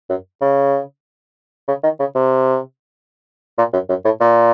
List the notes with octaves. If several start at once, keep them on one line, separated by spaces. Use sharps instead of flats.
F#2
C#3
C#3
D#3
C#3
C3
A#2
F#2
F#2
A2
A#2